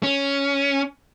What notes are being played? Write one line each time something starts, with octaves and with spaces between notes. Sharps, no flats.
C#4